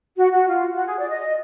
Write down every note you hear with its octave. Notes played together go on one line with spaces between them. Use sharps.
F#4
F#4
F4
F#4
G#4
D5
D#5